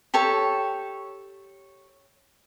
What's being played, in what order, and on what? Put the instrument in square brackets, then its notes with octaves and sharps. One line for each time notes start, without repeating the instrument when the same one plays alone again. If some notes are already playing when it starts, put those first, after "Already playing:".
[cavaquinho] G4 A4 C#5